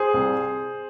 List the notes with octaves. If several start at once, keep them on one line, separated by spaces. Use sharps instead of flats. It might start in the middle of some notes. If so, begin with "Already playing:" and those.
Already playing: G#4 C5
C2